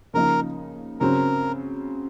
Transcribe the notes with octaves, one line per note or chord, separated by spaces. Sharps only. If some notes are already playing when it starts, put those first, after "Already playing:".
C#3 F3 A#3 D#4 A#4
C#3 F#3 C4 A#4